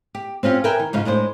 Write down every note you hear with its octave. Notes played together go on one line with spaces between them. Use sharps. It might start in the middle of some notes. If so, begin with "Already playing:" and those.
G4
C4 C#4 F4 G4
A#4 B4 E5 G5 G#5
D#3
G#2 C#3 D#4 F4
A2 G#3 D4 C5